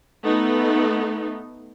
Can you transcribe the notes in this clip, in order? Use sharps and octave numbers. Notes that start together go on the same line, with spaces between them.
A3 B3 D#4